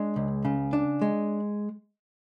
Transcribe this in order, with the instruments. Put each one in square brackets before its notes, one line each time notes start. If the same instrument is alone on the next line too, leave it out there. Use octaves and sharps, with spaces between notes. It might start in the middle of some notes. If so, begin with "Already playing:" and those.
Already playing: [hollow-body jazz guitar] G#3 D4
C#2
C#3
D4
G#3